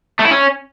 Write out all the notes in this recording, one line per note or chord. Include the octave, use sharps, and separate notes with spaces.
A3
E4
C#4